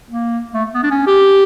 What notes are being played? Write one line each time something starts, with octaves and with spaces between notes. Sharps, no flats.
A#3
A3
B3
D4
C#4
G4